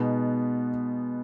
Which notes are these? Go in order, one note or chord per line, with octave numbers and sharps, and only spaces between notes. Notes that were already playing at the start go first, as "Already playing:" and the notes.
Already playing: B2 G#3 B3 D#4